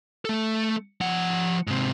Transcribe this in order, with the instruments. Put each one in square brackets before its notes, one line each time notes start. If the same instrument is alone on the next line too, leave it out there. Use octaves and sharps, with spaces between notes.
[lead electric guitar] A3 A4
F3 F#5
G#2 C3